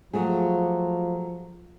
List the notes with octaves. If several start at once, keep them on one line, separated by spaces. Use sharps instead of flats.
F3 F#3 A3 G#4